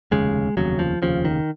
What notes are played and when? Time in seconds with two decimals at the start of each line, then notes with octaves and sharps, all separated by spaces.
0.11 F1 D#2 C#3 G#3
0.57 F1 D#2 C#3 F#3
0.79 F3
1.02 F1 D#2 C#3 F3
1.25 D#3